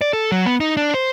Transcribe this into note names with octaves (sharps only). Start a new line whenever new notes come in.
D5
A4
F#3
B3
D#4
D4
C5